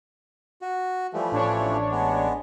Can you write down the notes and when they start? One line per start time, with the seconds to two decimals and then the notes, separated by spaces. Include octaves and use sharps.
0.62 F#4
1.13 E3 F3 G3 A3
1.31 A1 D4 C#5
1.91 G#3 B3